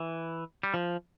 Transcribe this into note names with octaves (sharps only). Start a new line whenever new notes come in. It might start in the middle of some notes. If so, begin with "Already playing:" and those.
Already playing: E3
G3
F3